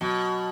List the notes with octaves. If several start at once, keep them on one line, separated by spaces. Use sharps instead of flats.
B2 F#3